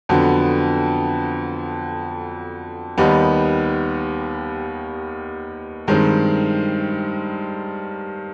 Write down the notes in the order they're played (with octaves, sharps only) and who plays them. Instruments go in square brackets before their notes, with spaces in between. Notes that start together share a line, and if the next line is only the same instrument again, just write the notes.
[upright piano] F2 D3 F#3 B3
D#2 D#3 G3 B3 D#4
G2 D#3 G#3 C4